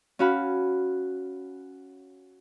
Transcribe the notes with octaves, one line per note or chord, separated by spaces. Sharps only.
C#4 F#4 F5 B5